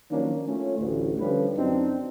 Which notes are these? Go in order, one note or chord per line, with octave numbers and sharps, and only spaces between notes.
D#3 F3 F#3 A#3 C#4 D4
A3 C#4 F4
A1 D2
D3 F3 G3 C#4 B4
F#2 C4 D4 D#4